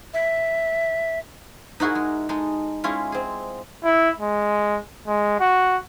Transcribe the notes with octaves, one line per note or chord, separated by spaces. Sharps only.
E5
D#4 E4 F#4 G#4 A#4
G#3
G#3 D#4 A4
G#3 C#4 E4 F4
C4 G#4
E4
G#3
G#3
F#4